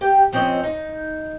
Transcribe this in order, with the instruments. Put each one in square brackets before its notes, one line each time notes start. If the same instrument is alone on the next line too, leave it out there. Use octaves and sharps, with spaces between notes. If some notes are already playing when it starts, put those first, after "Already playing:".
[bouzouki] G4 G5
F3 C4 C#4 D#5
D#4